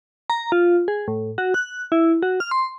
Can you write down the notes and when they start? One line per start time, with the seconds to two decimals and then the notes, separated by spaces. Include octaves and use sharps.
0.30 A#5
0.52 F4
0.88 G#4
1.08 A2
1.38 F#4
1.54 F#6
1.92 E4
2.23 F#4
2.40 F6
2.51 C6